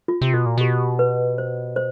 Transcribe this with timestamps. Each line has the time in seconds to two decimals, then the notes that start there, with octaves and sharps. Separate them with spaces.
0.08 F4
0.21 C3
0.34 B2 F#4
0.46 A#2
0.58 B2 G4
0.99 B4
1.38 C5
1.76 C5